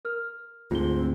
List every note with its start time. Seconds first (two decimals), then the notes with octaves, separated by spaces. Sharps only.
0.05 A#4 F6
0.71 D2 G#2 C4 F4 G7